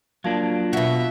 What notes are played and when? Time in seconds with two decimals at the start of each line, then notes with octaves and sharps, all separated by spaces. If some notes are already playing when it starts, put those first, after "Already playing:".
0.24 F3 F#3 A#3 D4
0.73 B2 F#4 E5